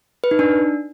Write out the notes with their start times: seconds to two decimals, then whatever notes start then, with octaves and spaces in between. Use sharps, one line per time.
0.24 B4
0.31 D#4
0.39 D4